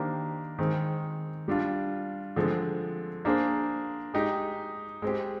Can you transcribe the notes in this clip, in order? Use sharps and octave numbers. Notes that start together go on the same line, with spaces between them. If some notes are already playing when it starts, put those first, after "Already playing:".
Already playing: D#3 A#3 D4 G4 C5
D#3 G#3 C4
G3 D4 F4
D3 F3 G#3 C4
A#3 D4 G#4 C5
G#3 D#4 G4
G#3 C4 G4